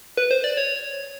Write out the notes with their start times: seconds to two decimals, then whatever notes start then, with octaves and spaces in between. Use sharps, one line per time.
0.17 B4
0.31 C5
0.44 D5
0.57 C#5